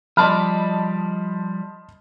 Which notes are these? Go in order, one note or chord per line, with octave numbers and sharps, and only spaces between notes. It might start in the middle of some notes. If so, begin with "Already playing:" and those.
F3 G3 D5 D#5 A5 B5 C6 F6